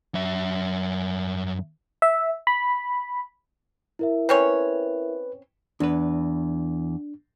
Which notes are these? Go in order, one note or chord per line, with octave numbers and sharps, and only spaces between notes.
F#2 E5
E5
B5
E4 A#4 E5
C4 C#4 B4 C#5
E2 D4 B4